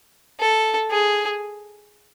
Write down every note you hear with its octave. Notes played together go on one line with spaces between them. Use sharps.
A4
G#4